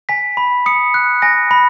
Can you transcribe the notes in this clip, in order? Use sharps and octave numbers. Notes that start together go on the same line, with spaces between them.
G#5 B6
B5
D#6 C#7
F#6
G#5 A#6
B5